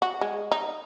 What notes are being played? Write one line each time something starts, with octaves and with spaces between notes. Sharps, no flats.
F#4
G#3
D#4